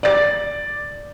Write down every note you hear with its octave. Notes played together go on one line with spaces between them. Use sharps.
D5 A6